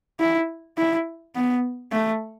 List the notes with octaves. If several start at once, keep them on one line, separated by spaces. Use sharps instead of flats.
E4
E4
B3
A3